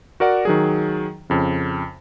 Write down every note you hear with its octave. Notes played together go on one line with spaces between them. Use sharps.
F#4 A#4 D5 F#5
D#3 F#3 G#4
F2 C#3